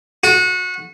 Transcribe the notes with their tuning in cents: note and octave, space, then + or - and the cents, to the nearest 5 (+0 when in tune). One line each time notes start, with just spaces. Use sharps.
F#4 -25